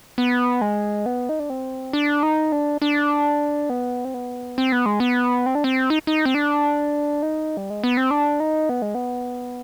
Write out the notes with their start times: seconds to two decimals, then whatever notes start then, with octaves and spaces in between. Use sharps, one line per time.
0.18 B3
0.61 G#3
1.06 B3
1.29 D#4
1.39 D4
1.50 C4
1.93 D4
2.23 D#4
2.52 D4
2.82 D4
3.70 B3
4.05 C4
4.14 B3
4.58 C4
4.72 B3
4.86 G#3
5.00 B3
5.46 C4
5.55 D4
5.64 C4
5.90 D#4
6.07 D#4
6.25 C4
6.35 D4
7.22 D#4
7.57 G3
7.70 G#3
7.84 B3
7.97 C4
8.11 D4
8.40 D#4
8.69 B3
8.82 G#3
8.95 B3